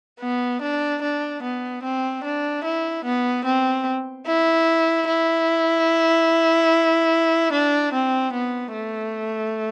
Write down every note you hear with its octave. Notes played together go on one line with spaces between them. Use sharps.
B3
D4
D4
B3
C4
D4
E4
B3
C4
E4
E4
D4
C4
B3
A3